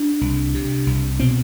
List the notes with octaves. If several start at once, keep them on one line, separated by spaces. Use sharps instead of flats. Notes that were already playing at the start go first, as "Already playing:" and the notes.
Already playing: D4
C2
C3
C2
B2 C4